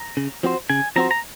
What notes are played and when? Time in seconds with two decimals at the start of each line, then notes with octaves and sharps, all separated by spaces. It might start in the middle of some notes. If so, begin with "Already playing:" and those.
Already playing: A#5
0.17 C#3
0.43 F3 C4 F#4 C5
0.69 C#3 G#5
0.96 F3 C4 F#4 C5 A#5
1.11 A#5